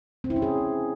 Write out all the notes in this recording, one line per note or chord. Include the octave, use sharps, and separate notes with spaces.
C4
E4
C#4
G#4